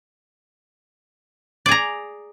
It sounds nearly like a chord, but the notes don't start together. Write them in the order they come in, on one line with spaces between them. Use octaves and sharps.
D5 G#4 A#5